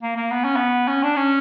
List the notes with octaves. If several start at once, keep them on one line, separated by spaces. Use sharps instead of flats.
A#3
A#3
B3
C#4
B3
C#4
D4
C#4